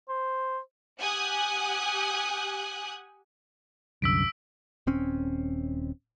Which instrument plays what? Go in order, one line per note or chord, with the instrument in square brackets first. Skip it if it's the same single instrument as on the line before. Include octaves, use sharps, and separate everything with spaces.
[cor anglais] C5
[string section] G4 F#5 G#5 D#6 F#6
[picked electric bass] C2 F#2 D3 [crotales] E6 B6 D7
[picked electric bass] D#1 C4 C#4